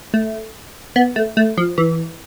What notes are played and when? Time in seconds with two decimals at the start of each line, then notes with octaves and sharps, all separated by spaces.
0.14 A3
0.96 B3
1.16 A3
1.37 A3
1.57 F3
1.78 E3